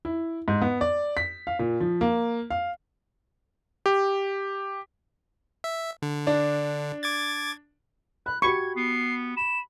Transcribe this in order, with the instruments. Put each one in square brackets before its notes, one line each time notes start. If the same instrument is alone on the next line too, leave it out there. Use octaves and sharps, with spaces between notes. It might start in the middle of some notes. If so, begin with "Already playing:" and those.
[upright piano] E4
G#2
B3
D5
B6
F5
A#2
F3
A#3
F5
[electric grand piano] G4
[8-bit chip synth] E5
D3
[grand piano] D4
[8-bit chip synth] D6 G#6 A6
[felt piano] B5 [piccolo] F#6
[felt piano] F#4 G4 B5 [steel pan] C#6 [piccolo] G#6
[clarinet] B3 [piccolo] C7
[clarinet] B5 [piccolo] E7